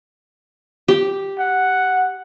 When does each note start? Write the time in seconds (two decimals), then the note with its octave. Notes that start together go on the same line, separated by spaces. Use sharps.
0.88 G4
1.38 F#5